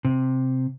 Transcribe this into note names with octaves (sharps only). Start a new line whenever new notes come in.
C3